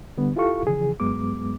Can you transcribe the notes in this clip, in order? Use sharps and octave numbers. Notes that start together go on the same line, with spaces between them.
D3 G3 B3
E4 F4 G4 A4 F5 C#6
C#3 E3 F3 G#4
G2 F#3 G#3 B3 D6